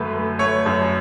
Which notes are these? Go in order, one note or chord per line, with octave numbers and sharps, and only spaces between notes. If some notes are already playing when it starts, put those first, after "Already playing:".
Already playing: F#2 D3 A3 B4
A3
A3 C#5
F#2